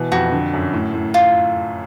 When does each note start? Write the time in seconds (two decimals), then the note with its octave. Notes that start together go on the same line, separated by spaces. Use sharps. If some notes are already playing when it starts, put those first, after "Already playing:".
Already playing: B2 E3
0.12 F2 F#4
0.32 D3
0.53 F#2
0.73 A2
0.94 A2
1.14 F4